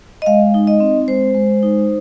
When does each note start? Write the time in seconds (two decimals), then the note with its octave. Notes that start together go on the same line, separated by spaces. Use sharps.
0.22 D#5
0.26 G#3 F5
0.54 D#4
0.67 D#5
0.80 C4
1.07 G#3 C5
1.34 G#3
1.63 D#4